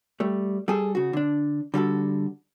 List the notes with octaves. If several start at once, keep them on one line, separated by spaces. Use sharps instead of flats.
G3 A3
G3 G#4 A4
C#3 F#4
D3 D4
D3 G3 F#4 A4